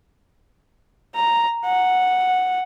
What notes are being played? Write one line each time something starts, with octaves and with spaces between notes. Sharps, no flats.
A#5
F#5